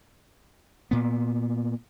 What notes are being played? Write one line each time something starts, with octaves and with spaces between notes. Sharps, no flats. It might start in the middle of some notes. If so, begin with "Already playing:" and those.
A#2 B3